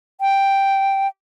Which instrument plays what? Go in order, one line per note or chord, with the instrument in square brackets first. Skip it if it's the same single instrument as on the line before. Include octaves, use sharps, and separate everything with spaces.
[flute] G5